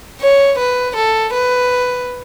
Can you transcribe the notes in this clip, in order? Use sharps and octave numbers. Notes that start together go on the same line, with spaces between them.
C#5
B4
A4
B4